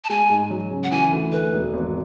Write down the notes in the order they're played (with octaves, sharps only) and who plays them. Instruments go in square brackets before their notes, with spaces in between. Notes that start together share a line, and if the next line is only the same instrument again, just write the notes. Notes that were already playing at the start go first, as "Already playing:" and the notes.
[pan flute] A5
[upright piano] G#3 [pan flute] G#5
[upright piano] G#2
F#3
C#3
[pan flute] F#5
[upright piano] E3 [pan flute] G#5
[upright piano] D2
[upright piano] A3 [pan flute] B4
[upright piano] E1
G#1